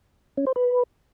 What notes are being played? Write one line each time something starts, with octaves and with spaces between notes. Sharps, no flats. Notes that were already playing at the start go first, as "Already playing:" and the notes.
C#4
C5
B4